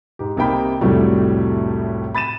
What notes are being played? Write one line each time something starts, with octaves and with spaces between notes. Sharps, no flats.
G#2 G4
C2 C3 A#3 D#4 G5 B5
C2 F2 A2 F#3 G3 A3
B5 A6 D#7 E7